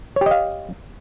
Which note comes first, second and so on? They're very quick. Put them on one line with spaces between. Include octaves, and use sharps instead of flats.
C#5 G4 D#5 F5